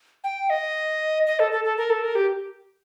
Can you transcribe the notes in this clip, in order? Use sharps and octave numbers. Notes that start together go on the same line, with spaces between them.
G5
D#5
D#5
A4
A4
A4
A#4
A4
A#4
G4